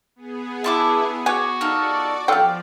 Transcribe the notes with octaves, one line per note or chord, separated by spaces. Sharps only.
B3 G#4
E4 A5 C6 D6
F#4 C#5 G#5 C#6 D6
D#4 F4 A4 D5
F3 F4 G4 A4 F5 G5